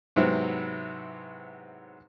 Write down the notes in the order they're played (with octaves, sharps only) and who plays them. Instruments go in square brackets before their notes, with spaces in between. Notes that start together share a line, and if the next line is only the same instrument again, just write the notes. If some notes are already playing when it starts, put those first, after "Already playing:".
[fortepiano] G#2 C3 F#3 B3 C4 E4